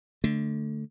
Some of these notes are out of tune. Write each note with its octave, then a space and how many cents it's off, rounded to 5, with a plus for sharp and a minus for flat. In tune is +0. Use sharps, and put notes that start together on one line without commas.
D3 +0 A3 +0